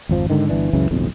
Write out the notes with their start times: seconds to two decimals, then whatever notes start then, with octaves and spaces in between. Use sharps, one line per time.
0.09 G#1 F2 F3
0.30 G#2 D3 D#3
0.49 G1 E3 D4
0.73 C#2 F#2 C#3 E3
0.91 D1 B1 F2